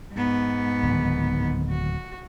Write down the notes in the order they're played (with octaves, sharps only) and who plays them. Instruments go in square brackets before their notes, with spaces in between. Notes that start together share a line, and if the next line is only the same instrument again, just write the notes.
[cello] G#2 B3
[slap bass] D1 D#3
[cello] F#4